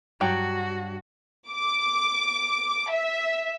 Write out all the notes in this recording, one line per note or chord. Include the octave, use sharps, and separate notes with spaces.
G2 F#3 F#4 G5
D6
E5